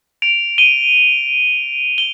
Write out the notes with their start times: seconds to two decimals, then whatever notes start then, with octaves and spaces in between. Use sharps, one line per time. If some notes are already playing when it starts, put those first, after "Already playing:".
0.22 D7 F7
0.58 D#7 G7
1.98 G7